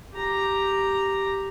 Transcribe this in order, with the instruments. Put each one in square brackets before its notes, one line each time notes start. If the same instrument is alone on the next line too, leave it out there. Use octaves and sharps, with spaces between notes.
[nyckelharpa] G4 A#5